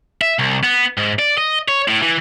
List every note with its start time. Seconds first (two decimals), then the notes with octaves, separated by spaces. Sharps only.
0.21 E5
0.39 C2
0.63 B3
0.98 G#2
1.19 D5
1.38 D#5
1.68 C#5
1.88 A2
2.02 E3